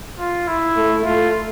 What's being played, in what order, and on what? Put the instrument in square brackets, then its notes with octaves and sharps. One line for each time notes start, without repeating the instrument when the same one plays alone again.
[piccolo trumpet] F4
E4
[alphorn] A3
[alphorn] A3 [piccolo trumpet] F4